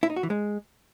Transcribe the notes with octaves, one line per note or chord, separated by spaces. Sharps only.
E4
D#4
F#4
E3
G#3